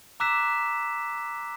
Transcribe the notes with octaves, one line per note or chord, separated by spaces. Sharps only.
A#5 D6 E6 F#6 B6 E7